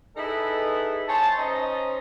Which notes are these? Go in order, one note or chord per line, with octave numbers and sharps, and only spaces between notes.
D#4 E4 G#4 A4 B4 D#5
C5 C#5 G#5 A5
C#4 D#4 C5 D#5